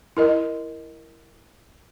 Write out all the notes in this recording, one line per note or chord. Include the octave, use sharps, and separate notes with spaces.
E4 A#4 D#5